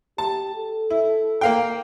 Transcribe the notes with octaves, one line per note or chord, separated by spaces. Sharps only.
G4 A5
A4
E4
A#3 F5 G5